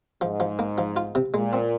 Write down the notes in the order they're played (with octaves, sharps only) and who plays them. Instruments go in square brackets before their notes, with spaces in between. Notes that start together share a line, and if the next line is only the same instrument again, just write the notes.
[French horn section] G#2 [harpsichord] F3
[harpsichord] F3
A#3
F3
F4
C3
[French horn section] A#2 [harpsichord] G#3
[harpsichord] C4